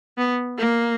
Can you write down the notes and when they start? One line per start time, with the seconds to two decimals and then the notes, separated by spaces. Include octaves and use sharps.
0.18 B3
0.58 A#3